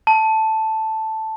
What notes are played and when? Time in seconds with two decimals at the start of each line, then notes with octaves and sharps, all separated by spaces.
0.07 A5